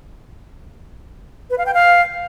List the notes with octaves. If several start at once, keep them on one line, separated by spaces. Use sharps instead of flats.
B4
F5
G5
F5